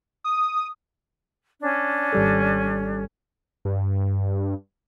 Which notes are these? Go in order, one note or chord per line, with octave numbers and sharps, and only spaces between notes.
D#6
C#4 D4
G#1 G3 A4
G2